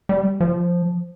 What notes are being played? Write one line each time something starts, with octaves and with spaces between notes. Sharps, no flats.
G3
F3